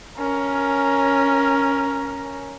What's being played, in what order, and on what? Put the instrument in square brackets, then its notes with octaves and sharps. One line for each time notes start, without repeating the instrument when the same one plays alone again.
[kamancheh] C#4 A#4